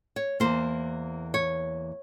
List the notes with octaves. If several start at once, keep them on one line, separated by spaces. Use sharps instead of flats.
C#5
E2 E3 A#3 C5
C#5